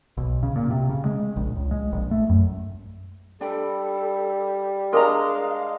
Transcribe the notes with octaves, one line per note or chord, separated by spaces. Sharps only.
B1
C#3
A#2
C3
C#3
G#3
A#1
C#2
G#3
A#1
A3
F#2
G3 D4 A4 G5 B5
G#3 D4 A#4 D#5 F5 A#5